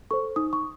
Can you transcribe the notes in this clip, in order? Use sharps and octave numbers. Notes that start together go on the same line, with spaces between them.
A4 C5 C#6
D#4 D#6
C#6